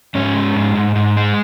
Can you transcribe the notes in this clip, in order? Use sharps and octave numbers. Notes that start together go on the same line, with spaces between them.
G#2 C#4
G#3
G#2
G#2
G#2
G#3